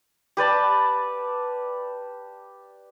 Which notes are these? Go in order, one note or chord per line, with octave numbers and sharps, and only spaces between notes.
G4 B4 D5 A5